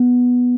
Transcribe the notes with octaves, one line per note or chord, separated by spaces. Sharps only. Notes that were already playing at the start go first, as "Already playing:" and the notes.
Already playing: B3